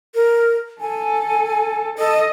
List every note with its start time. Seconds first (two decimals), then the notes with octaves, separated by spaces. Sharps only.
0.14 A#4
0.80 A4 G#5
1.98 A4 D#5